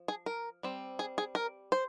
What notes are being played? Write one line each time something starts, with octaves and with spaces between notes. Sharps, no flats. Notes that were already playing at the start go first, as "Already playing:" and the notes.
Already playing: F3
G#4
A#4
G3 C4
G#4
G#4
A#4
C5